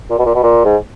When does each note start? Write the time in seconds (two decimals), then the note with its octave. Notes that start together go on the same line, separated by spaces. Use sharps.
0.10 A#2
0.19 B2
0.26 A#2
0.35 B2
0.43 A#2
0.65 G#2